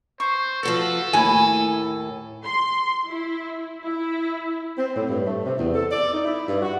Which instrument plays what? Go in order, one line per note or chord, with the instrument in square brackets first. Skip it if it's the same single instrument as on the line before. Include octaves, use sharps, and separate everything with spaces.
[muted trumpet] C5 [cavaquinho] C#6
[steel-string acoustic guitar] F3 F#4 B4 [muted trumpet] A4
[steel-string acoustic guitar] D#2 A2 [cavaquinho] E4 F#4 [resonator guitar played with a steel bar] G#5
[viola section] C6
E4
E4
[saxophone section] C4
A2
G2
A3
C3
E2
A4
D5
D#4
E4
G2
F#4